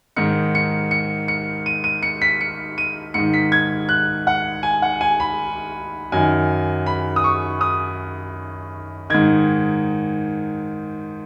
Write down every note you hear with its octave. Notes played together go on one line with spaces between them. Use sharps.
G#2 D#3 C#7
C#7
C#7
C#7
D#7
D#7
C#7
B6
C#7
D#7
G#2 D#3 C#7
B6
G#6
F#6
F#5
G#5
F#5
G#5
B5
F#2 D#3 G#5
B5
D#6
C#6
D#6
G#2 D#3 G#6